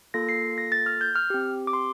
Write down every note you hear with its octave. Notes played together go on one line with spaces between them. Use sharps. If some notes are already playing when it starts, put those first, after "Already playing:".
A#3 F4 A4 A#6
C7
A#6
A6
F6
G6
F6
C4 G4
D6
C6